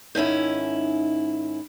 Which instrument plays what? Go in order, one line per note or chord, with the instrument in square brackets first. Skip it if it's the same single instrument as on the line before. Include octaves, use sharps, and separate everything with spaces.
[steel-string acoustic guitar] G#2 D#3 C#4 E4